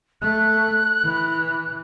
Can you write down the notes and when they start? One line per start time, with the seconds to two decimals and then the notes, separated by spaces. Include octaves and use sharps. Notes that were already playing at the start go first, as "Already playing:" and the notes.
0.22 A3 F#6
1.04 E3